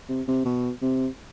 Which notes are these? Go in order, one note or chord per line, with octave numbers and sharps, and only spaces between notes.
C3
C3
B2
C3